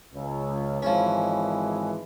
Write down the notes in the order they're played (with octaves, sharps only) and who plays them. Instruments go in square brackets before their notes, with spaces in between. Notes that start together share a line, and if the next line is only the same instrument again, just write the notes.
[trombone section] C#2
[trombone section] G#1 E3 G#3 [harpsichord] F3 C#4